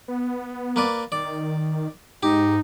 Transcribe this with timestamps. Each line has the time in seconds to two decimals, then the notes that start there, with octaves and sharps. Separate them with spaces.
0.08 B3
0.76 A#3 B4 D5
1.12 D#3 D5
2.23 G#2 D#4 G4